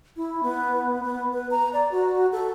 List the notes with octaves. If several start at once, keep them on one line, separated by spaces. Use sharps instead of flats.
E4
B3
B3
B4
A#5
D5
F#4
A4